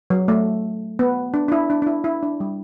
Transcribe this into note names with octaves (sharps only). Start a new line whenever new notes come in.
F#3
A3
B3
D4
D4
E4
D4
D4
E4
E4
D4
G3